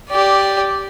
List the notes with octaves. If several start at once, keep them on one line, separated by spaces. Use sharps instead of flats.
G4 D5